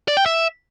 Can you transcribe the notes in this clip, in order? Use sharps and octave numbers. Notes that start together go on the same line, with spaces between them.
D5
G5
E5